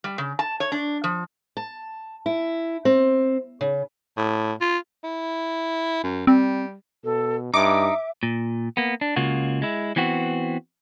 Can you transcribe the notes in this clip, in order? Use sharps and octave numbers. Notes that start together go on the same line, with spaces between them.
G3
C#3
A5
C#5
D4
F3
A5
E4
C4
C#3
A2
F4
E4
F#2
G3 C4
B2 A4
G2 D#4 E5 D6
A#2
A#3 B3
D4
C#2 C#3 A#3 F4 F#4
G#3 E4
E3 B3 C4 F#4